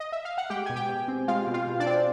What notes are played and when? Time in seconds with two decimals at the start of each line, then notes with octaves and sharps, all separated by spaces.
0.00 D#5
0.12 E5
0.25 F5
0.38 F#5
0.50 G#3 G4 G5
0.66 B2 G#5
0.76 G4 G5
0.89 B2
1.08 C4
1.28 G#3 F4 F5
1.47 B2
1.54 F4 F5
1.67 B2
1.80 D4 D5
1.86 C4